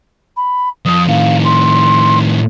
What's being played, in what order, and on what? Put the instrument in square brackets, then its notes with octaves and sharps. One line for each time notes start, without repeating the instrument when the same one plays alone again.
[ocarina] B5
[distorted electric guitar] F2 F3 [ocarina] D#6
[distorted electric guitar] A2 D#3 [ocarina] F5
[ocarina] C6